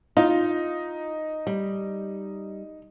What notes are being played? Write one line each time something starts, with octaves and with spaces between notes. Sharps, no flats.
D#4 F4
G3